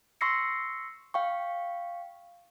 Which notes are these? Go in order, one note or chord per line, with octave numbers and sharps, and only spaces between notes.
C6 C#6 E6 A#6 C7 C#7
F5 G5 C#6